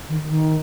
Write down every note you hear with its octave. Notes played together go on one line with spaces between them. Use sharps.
D#3
D#3